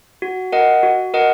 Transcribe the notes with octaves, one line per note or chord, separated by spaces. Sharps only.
F#4
A#4 D#5 F#5
F#4
A#4 D#5 F#5